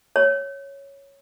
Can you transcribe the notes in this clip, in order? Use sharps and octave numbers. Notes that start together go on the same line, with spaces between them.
C#5